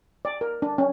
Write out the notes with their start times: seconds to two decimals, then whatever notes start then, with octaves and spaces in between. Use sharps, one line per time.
0.25 D5
0.41 A#4
0.62 D4
0.78 C#4